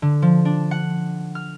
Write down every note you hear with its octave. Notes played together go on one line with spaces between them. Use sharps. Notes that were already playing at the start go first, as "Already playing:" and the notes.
D3
F3
D4
F#5
F6